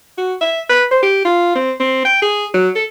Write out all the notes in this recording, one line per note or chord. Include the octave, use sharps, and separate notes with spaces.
F#4
E5
B4
C5
G4
F4
C4
C4
G5
G#4
F#3
A4